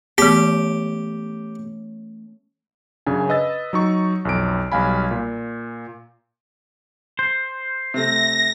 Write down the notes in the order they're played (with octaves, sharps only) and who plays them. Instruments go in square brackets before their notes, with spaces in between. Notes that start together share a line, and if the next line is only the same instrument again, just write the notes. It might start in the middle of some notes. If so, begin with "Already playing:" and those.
[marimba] E3 B3 [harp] A3 C#4 [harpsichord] G4
[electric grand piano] F#2 C#3 D4 G#5
B4 D#5 E6 A6
F#3 D#4 C#6
B1 F2 D7
B1 G3 F5 G#5 B5
A#2
[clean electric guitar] C5
[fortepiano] C3 A3 [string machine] A#6